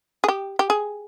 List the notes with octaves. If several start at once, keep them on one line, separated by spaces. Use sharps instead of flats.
G#4
G4
G4
G#4